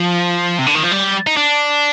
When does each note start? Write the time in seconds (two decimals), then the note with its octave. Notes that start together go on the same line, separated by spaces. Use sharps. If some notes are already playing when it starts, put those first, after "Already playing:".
Already playing: F3
0.59 C3
0.67 D3
0.75 D#3
0.83 F3
0.92 G3
1.27 D#4
1.37 D4